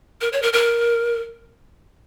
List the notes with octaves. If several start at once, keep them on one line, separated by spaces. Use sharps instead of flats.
A#4
C#5
A#4
A#4